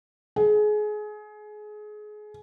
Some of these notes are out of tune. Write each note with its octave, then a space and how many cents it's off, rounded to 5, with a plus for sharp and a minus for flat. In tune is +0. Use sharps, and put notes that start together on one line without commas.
G#4 +25